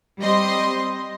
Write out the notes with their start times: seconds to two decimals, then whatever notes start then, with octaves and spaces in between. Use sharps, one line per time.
0.20 G3 C4 D#5 C6